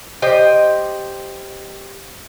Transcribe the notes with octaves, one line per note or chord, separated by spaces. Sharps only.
G4 C5 D#5